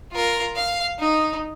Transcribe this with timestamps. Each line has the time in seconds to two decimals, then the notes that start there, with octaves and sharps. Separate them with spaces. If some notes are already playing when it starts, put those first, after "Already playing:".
0.13 F4 A#4
0.56 F5
0.99 D#4